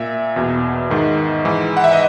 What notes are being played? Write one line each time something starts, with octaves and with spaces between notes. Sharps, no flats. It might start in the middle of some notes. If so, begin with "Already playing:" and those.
Already playing: A#2 E5
E2 B2
G#2 D#3
G#2 E3
F#5
E5
D#5